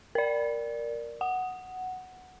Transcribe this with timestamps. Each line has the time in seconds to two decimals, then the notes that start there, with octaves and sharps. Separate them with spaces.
0.15 A#4 D5
1.21 F#5